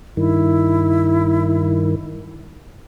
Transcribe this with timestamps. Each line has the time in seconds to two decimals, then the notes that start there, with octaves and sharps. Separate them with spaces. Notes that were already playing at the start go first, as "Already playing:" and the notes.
0.17 G2 D#3 E4